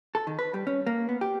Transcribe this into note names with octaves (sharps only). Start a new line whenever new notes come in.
A4
D#3
B4
G3
C#4
A#3
B3
G4